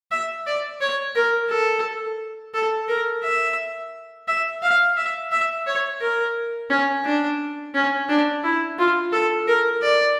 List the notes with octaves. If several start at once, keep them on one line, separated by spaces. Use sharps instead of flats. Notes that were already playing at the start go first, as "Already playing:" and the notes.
E5
D5
C#5
A#4
A4
A4
A#4
E5
E5
F5
E5
E5
C#5
A#4
C#4
D4
C#4
D4
E4
F4
A4
A#4
D5